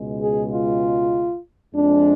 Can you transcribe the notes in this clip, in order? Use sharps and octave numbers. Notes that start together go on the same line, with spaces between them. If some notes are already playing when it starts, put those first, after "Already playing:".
Already playing: C#2 B2 G#3
G#4
F4
F2 F3 G#3 D4